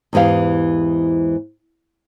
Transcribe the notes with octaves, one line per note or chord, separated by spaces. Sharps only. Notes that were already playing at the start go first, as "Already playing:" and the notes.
E2 G#2 E3 G4 F5